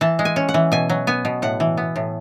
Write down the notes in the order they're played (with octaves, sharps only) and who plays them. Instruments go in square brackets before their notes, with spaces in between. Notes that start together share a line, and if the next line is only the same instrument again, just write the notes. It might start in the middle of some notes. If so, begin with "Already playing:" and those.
[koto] E3 A5
G#3
G#5
C#4
F#5
E3
B2 G#5
F#3
B3 G#5
B2
A2 F#5
E3
B3
A2